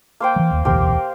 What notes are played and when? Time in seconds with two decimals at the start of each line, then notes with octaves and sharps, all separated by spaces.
0.20 A#3 C5 G5
0.36 E3 F#3
0.50 D1 D#2
0.65 D1 B1 E2 G4 A#4 C5